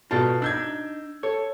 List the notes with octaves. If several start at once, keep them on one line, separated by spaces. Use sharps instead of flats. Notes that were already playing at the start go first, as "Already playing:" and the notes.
B2 F4 A4 D5 A5
D4 D#4 E6 G6 G#6
A4 C#5